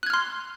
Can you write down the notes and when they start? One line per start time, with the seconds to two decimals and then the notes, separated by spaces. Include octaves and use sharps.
0.03 F#6
0.07 G#6
0.10 F6
0.14 C6